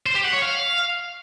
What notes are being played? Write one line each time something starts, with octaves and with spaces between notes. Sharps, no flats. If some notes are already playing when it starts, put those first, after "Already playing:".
C5
G4
F#5
C#5
F5